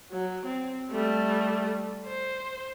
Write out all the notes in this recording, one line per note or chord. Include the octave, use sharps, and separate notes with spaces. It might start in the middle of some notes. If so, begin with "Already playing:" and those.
F#3
C4
G3 A3
C5